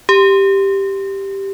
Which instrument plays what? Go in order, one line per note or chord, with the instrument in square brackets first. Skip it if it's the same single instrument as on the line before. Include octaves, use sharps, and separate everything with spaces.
[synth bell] G4